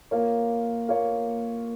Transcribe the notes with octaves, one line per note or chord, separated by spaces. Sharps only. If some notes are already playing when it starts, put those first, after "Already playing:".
A#3 F4 C#5
A#3 F4 C#5